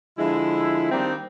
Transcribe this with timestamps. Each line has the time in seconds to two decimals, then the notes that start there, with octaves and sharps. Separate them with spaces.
0.18 D3 F3 G#3 E4
0.92 D#3 G3 A#3 C4 D4 D#4